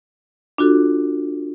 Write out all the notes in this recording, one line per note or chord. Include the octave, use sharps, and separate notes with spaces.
D4 F4 F#4 A4